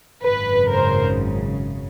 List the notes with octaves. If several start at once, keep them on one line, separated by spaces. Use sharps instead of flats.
G#1 F#2 C#3 B4
A#4 C5